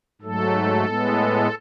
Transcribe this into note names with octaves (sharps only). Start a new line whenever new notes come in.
G#2 F#3 A3 A4
A2 G#3 B3